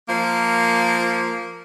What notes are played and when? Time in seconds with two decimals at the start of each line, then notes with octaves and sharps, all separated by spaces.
0.08 F3 A#3